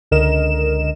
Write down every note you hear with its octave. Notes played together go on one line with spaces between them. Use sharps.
C#2 D3 A#4 D#5 E7